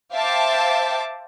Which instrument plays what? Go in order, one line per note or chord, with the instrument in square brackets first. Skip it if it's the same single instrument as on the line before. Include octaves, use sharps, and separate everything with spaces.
[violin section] C5 E5 F5 G5 A5 D6